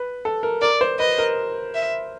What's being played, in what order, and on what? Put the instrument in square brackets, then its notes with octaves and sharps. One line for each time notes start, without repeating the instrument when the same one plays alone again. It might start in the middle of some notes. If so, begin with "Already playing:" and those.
Already playing: [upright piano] B4
A4
A#4
[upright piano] A#4 [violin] D5
[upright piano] C5
[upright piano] B4 [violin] D#5
[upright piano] A#4
[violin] E5